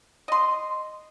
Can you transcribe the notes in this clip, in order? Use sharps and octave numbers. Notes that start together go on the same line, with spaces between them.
D#5 C6